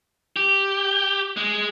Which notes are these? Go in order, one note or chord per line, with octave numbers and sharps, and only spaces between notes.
G4
G#3